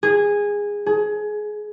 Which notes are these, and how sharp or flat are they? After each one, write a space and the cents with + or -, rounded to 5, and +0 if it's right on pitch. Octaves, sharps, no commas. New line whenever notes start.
G#4 -15
G#4 +20